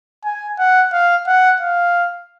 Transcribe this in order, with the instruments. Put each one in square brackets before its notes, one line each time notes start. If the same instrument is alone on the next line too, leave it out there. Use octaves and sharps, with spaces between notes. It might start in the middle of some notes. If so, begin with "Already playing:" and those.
[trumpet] G#5
F#5
F5
F#5
F5